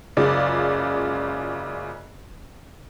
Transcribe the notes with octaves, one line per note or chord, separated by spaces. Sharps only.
F#1 C#3 G#3 F4 D5